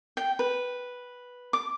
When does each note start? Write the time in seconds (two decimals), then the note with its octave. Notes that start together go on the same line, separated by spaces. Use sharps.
0.17 G5
0.39 B4
1.53 D6